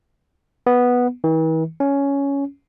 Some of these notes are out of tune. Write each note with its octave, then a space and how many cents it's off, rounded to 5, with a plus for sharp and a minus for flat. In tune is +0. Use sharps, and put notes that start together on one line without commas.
B3 -5
E3 -45
C#4 +10